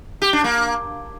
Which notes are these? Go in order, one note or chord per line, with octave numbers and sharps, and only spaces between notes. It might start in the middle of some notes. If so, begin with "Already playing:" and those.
G4
D4
A#3